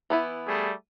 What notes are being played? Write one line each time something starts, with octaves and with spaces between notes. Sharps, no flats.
E3 B3 E4
G3 A3 G#4